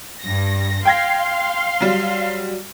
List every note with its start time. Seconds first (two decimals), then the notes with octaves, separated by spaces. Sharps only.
0.21 G2 A#6
0.85 F5 G5 C6 G#6 A#6
1.80 F#3 G3